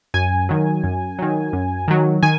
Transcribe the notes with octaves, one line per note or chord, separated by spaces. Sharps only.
F#2 G#5
D#3 F#3
F#2
D#3 F#3
F#2
D#3 F#3
D#3 G#5